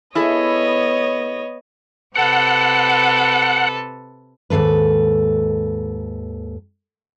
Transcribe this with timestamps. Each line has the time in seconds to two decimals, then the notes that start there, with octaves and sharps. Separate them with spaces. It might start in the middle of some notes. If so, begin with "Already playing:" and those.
0.15 B3 E4 G#4 A4 C#5 D#5
2.16 C3 A4 B4 F#5
4.50 D#2 G#2 C3 A4 B4